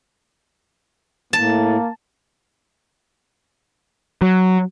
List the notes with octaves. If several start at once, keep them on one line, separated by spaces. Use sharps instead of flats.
A2 A#3 A5
F#3